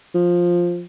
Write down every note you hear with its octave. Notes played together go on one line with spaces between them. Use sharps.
F3